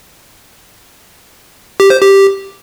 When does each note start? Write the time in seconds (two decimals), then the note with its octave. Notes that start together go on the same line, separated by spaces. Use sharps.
1.80 G4
1.90 C5
2.01 G4